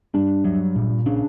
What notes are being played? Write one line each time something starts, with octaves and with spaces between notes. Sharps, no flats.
G2 D4
F#3
A#2
C#3 D4